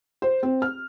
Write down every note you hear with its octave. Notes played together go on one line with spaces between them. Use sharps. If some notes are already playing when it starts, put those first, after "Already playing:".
C5
C4
F6